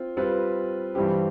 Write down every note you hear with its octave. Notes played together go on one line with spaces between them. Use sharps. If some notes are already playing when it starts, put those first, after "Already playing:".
Already playing: C4 F4
G3 C4 F4 B4
G2 E3 G3 C4 G4